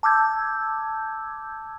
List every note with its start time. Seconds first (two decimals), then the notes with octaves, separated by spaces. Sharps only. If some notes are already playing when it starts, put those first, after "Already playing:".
0.03 A5 D6 E6 G6 G#6